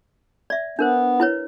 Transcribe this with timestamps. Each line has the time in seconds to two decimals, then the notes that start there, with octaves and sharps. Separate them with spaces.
0.50 D5 E5
0.79 B3 D4 A#4 C5
1.20 E4 B4 C#5